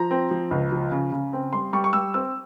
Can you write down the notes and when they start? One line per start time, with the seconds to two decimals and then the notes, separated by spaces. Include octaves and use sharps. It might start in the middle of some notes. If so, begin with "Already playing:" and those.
Already playing: F3 A#5
0.11 C4
0.31 F3
0.51 C#2
0.72 F3
0.92 C#3
1.12 C#3
1.33 C4
1.53 G3 C6
1.73 G3 C#6
1.84 C#6
1.93 G3 E6
2.14 C4 E6